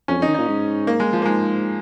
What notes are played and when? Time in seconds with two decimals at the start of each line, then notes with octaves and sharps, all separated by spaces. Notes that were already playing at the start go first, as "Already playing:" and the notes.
0.08 F2 C#4
0.19 F2
0.22 D#4
0.28 D#3
0.34 A#2 D#4
0.48 G#2
0.87 A#3
1.00 G#3
1.13 F3
1.22 A#3
1.25 G#2 G#3